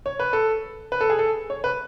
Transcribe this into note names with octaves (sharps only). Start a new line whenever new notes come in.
C#5
B4
A4
B4
A4
G#4
A4
C#5
B4